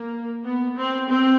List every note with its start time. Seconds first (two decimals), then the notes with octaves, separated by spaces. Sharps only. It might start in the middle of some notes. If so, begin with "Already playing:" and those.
Already playing: A#3
0.45 B3
0.77 C4
1.08 C4